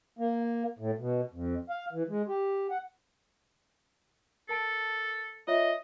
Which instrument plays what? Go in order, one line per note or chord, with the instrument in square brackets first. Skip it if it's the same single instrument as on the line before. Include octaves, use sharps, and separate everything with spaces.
[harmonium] A#3
A2
B2
F2
F5
E3
G#3
G4
F#5
[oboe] A4 [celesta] A#4 A5 D7
[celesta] F4 C#5 E5 [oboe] D#5